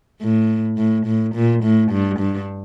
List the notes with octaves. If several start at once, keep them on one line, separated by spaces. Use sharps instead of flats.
A2
A2
A2
A#2
A2
G2
G2